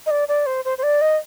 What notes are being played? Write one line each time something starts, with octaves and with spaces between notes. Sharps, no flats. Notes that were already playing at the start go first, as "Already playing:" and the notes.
D#5
D5
D5
C5
C5
C5
D5
D#5